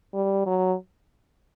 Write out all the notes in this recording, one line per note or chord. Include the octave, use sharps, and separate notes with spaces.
G3
F#3